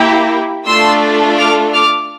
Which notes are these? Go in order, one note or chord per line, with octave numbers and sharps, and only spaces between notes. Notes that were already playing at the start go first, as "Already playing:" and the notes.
Already playing: A#3 E4 G4
A3 D4 F4 A4 C6 E6
D6 F6
D6 F6